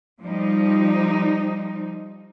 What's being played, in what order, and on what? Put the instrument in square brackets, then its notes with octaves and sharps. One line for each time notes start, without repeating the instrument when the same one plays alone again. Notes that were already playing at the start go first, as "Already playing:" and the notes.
[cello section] F3 G3 D#4